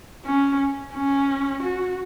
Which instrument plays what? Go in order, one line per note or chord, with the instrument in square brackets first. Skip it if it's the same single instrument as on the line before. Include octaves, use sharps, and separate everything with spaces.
[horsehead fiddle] C#4
C#4
F#4